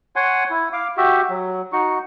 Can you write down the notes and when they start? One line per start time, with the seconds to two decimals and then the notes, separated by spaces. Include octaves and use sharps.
0.16 C#5 F#5 G#5 C6
0.50 E4
0.73 F5 D6
0.97 F#4 G4 E5
1.30 F#3
1.72 D#4 F#4 C#6